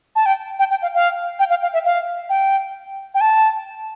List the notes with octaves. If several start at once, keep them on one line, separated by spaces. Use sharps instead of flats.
A5
G5
G5
G5
F5
F5
G5
F5
F5
E5
F5
G5
G5
A5